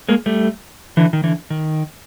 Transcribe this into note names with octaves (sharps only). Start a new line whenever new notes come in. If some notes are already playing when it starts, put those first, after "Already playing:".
G#3 A#3
G3 A3
D3 E3
D#3
D3 E3
D#3